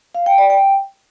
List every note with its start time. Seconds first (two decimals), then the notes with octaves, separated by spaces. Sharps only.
0.15 F5
0.26 G5
0.38 D5
0.50 G5